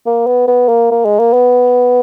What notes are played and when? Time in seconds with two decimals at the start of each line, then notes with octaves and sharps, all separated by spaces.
0.06 A#3
0.27 B3
0.47 B3
0.69 A#3
0.91 A#3
1.05 G#3
1.19 A#3
1.33 B3